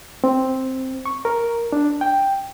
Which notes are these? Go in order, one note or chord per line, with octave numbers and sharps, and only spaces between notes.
C4
C#6
A#4
D4
G5